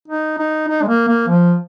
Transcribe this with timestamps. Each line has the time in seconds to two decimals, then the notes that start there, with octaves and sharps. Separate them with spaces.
0.08 D#4
0.38 D#4
0.68 D#4
0.82 G#3
0.88 A#3
1.08 A#3
1.28 F3